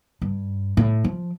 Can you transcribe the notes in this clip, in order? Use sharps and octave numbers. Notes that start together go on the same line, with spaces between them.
G2
A2
F3